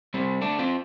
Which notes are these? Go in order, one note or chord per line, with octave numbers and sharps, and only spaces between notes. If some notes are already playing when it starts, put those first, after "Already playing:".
G3 C4
A3 D4
C4 F4